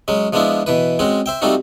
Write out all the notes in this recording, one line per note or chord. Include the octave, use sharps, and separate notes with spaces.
F#3 G#3 C#4
F3 G#3 B3 D4 E4 F4
B2 E3 B4
G#3 C4 C#4 F#4
C5 E5 G5
G3 A3 C4 D#4 F4 F#4